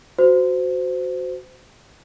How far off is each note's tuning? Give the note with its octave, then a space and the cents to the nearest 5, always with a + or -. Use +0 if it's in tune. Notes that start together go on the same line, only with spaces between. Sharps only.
F#4 +0 C5 -25